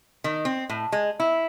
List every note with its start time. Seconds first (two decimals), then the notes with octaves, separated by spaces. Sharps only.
0.24 D#3
0.45 C4
0.69 A2
0.92 G#3
1.20 E4